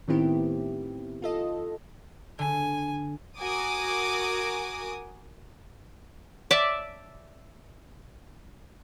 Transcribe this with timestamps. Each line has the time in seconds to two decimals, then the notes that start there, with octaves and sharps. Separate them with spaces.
0.08 A2 D#3 B3 C4 E4 G4
1.22 F4 A4 D#5
2.39 D3 G#5
3.39 F#4 A#4 G#5 D6 D#6
6.51 D5 E5 A5